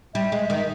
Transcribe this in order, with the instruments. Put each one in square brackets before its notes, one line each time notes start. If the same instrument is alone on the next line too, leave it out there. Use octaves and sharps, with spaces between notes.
[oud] G3 [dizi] E5
[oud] G#3
D#3